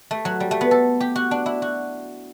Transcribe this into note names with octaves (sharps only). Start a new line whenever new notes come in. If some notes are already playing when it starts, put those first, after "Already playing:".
A3
F#3
G3
A3
B3
A4
G4
F#4
D4
E4
F#4